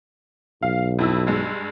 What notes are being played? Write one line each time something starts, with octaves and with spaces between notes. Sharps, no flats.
B1 F5
F2 E4 E6
G2 G#3